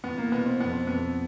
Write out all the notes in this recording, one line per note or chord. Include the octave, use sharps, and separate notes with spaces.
E2 B3
A#3
B2 B3
C4
F2 B3
C4
F2 B3